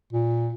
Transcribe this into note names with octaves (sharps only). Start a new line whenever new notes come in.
A#2